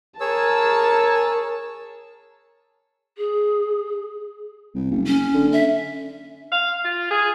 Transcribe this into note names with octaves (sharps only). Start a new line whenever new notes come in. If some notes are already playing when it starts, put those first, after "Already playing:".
G#4 A#4 C#5 A5 E6
G#4
C2
F#1
C#4
D3
E5
F5
F4
G#4